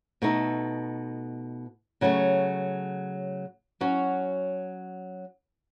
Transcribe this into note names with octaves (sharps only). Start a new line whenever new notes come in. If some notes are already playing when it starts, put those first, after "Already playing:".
B2 A3 D#4 A4
C#3 F#3 A3
F#3 C#4 F#4